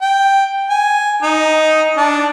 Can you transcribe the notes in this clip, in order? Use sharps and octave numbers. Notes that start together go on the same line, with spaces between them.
G5
G#5
D#4
D4